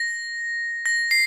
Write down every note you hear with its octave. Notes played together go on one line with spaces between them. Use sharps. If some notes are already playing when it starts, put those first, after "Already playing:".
Already playing: A#6
A#6
C7